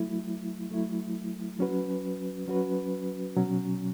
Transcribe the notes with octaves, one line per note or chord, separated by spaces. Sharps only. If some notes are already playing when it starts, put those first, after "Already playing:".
Already playing: F#3 A3 E4
F#3 A3 E4
F#3 C#4 F#4 B4
F#3 C#4 F#4 B4
B2 F#3 C#4